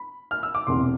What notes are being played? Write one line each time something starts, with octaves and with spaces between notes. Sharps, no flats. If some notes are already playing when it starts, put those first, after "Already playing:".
Already playing: B5
F6
E6
D6
E1 E2 C3 C6